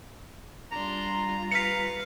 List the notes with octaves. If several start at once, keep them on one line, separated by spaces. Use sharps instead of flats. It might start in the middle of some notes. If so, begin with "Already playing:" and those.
G3 D4 F4 A#5 C6
B4 F5 B6 C#7